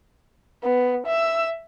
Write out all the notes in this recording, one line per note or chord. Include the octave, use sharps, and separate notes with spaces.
B3
E5 E6